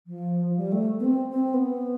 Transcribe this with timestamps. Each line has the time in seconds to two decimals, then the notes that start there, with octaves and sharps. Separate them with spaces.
0.07 F3
0.57 G3
0.72 A3
1.00 B3
1.05 C4
1.30 C4
1.54 B3